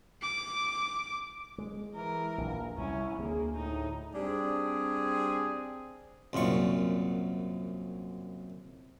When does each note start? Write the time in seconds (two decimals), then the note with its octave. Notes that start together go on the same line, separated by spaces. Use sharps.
0.22 D6
1.58 G#3
1.96 E3 A#4
2.38 A#1 E2
2.78 C2 C#4 E4
3.19 D2 A#3 G#4
3.56 A2 D#4
4.15 G3 C4 D4 G#4
6.33 C2 F#2 A#2 C#6